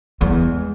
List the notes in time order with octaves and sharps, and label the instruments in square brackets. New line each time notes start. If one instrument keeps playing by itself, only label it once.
[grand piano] E2 E3 [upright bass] G#3